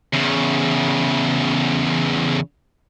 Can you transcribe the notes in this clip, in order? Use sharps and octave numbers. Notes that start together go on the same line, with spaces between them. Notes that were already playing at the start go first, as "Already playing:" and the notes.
E2 C#3